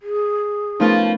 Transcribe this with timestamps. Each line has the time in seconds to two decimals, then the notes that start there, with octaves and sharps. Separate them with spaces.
0.02 G#4
0.80 F3 A3 B3 C#4 D#4 F4 A#4